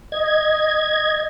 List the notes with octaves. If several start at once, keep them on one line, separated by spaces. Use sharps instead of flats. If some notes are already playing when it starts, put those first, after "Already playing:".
D#5 G#6